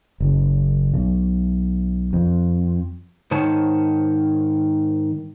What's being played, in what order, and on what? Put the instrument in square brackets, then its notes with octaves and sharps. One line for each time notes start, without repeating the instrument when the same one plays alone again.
[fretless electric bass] F#1
B1
F2
[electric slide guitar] G#2 D#3 C5 C#5 A5